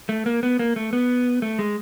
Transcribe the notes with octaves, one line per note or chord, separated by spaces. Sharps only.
A3
A#3
B3
A#3
A3
B3
A3
G#3